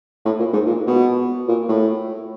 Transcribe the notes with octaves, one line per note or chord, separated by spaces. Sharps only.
A2
A#2
G#2
A#2
B2
A#2
A2